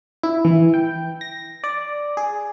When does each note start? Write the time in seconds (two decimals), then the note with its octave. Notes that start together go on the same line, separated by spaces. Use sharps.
0.23 E4
0.45 E3
0.74 G5
1.21 A#6
1.64 D5
2.17 G#4